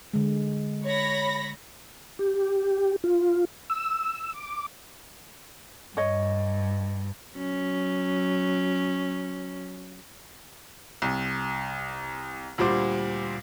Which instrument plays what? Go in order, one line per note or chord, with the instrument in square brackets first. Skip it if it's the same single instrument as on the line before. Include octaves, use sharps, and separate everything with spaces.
[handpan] D3 G#3
[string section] C#5 B5 A#6
[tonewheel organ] G4
F4
E6
D6
[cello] G2 [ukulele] C#5 D#5
[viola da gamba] F#3 C#4
[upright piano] C2
D2 A#2 G3 C5 D6